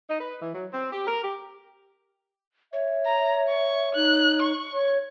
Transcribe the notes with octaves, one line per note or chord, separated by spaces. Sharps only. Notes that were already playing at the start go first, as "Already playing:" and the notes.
D#4
B4
E3
F#3
C4
G4
A#4
G4
C#5 E5
A#5
C#6
D#4 F#6
C#6
C#5